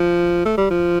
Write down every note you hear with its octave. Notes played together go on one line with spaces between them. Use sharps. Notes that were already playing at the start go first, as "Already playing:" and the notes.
Already playing: F3
A3
G3
F3